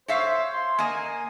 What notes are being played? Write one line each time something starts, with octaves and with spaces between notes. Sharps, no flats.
C5 C#5 E5 F5
C6
A#3 D#5 G#5